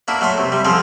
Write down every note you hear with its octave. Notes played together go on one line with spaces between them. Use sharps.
A#3 D4 E4 F#4
F#3 A3 A4 C6
C3
G3
D3 F3 C4 G#4 A4